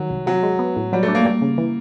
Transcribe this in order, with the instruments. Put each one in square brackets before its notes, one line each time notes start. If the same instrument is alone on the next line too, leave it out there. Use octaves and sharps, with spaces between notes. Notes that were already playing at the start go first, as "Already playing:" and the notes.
Already playing: [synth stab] D#3 G3 [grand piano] F#3
[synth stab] C2
[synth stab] C3 [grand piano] F#3
[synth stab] G#3
B3
A2
[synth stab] F#3 [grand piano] G3
[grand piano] A3
[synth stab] D4
[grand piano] A#3
[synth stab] G3 [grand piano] A#3
[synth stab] C#3
E3